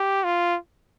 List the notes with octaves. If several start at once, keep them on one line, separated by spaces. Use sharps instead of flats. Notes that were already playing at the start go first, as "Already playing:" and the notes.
Already playing: G4
F4